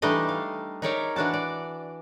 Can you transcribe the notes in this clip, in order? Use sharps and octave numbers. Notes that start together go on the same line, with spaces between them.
E3 G3 A3 D4 D#4 D#5
F5
D#4 G#4 A#4 C#5 D5 E5
E3 D4 F#4 A5
D5